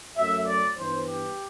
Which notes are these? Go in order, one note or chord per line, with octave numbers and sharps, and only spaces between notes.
F#2 F#3 A3 E5
D5
G2 E3 B3 C5
G4